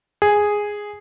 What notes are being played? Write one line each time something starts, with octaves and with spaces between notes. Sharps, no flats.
G#4